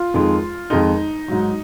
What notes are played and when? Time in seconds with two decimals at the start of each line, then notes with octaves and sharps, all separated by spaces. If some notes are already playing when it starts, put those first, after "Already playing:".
Already playing: F4
0.14 F2 D#3 G#3
0.70 F2 D#3 G#3 D#4
1.28 G#2 F#3